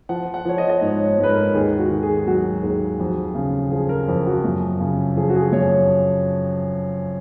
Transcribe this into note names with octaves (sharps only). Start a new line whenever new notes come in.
F3 F#5
F#5
F3 C#5
D#5
D#5
G#2 C#5
C#5
G#2
B4
A#4
D#2 G#4
F#4
D#3
G#4
F#3 F#4
D#2 G#4
F2
C#3
F3 G#4
A#4
F2
F#4
F#2
C#3
F3 G#4
F#4
G#4
F#2 C#5